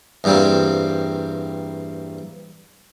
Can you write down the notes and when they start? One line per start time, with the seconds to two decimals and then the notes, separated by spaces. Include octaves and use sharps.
0.24 E2 G2 G3 A#3 C4